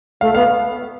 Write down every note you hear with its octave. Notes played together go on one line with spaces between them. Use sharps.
A3 F5
B3 F5